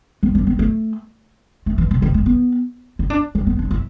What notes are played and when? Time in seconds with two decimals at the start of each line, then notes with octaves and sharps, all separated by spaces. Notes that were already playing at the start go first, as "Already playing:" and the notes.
0.23 B3
0.35 D4
0.47 B3
0.59 A3
1.66 A3
1.78 E3
1.91 B2
2.02 D3
2.14 A3
2.26 B3
2.99 E4
3.10 D4
3.35 D4
3.47 B3
3.59 D4
3.71 E4